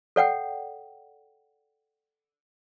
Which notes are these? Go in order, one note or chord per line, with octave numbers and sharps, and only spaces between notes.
A4 D5 F#5 G5